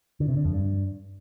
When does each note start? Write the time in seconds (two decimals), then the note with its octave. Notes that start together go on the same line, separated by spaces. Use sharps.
0.20 D3
0.28 C3
0.37 D3
0.45 F2
0.53 G2